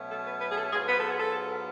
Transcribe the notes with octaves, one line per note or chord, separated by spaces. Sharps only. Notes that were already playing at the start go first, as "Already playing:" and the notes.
Already playing: B2 F#3 A3 C#4
A4
B4
B4
G#4
A4
G#2 F#3 B3 F4 G#4
B4
A4
G#4
A4